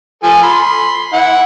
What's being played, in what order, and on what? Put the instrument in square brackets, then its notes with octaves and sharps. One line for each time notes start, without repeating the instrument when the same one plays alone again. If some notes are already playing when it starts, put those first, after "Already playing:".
[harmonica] F3 A4 G#5
B5 C6
E4 F#5